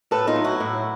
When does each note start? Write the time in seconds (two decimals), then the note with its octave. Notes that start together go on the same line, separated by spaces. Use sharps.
0.11 A2 A4 B4
0.27 D#4 F4
0.36 F#3
0.44 E4 F#4
0.60 A2